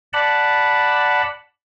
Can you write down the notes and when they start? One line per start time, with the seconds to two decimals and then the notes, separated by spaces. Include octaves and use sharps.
0.13 D5 F#5 A5 B5